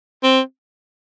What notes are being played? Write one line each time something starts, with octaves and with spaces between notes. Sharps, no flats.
C4